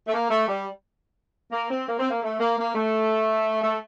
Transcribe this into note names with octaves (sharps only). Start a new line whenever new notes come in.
A3
A#3
A3
G3
A#3
C4
A#3
C4
A#3
A3
A#3
A#3
A3
A3